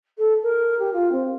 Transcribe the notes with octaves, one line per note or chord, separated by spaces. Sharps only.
A4
A#4
G4
F4
C4